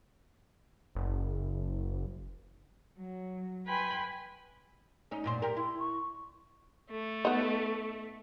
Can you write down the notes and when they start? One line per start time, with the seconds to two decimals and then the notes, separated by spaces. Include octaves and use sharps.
0.95 F#1
2.99 F#3
3.66 B4 G5 G#5 B5 C6
5.11 C#4 D#4
5.24 F#2 A#2 C5
5.42 G4 A#4
5.57 E4 C6
5.79 C#6
6.91 A3
7.25 B3 D#4